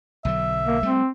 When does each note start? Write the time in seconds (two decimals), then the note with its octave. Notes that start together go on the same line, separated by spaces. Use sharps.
0.25 B1 D3 F#3 E5
0.67 A#3
0.83 G3 A3 C4